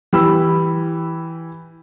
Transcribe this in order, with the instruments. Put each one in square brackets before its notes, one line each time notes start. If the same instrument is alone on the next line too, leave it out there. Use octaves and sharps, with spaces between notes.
[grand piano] E3 G4 B5 E6